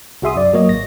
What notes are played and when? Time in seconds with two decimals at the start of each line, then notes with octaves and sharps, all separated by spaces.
0.22 C2 F#4 G#4 E5 C6 D#6
0.36 F#2 D5
0.53 F#3 A#3 C#5 D#5
0.69 G#1 A#6